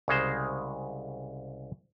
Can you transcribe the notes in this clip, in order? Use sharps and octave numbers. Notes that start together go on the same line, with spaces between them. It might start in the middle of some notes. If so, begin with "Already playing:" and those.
C2 C#3 G#3 C5